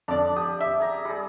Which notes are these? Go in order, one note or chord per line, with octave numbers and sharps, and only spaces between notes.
F2 D4 D5
G4 D#6
E5
G#4 A#5
G3 G#4